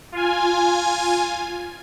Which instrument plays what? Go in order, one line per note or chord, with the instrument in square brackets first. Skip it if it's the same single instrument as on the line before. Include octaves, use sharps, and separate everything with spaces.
[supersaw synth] F4 G#5